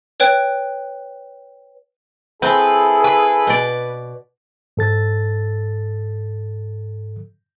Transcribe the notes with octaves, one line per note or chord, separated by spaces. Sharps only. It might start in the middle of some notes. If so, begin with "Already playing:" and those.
B4 C#5 G5 F#6
C4 E4 G#4 A4 B4
B4
B2 D5
G#2 A4 A6